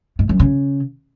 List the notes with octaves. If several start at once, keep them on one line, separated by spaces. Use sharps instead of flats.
G#2
F#2
C#3